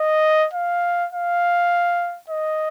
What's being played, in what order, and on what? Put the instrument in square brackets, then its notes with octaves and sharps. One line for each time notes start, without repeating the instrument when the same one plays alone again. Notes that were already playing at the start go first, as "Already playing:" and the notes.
Already playing: [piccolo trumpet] D#5
F5
F5
D#5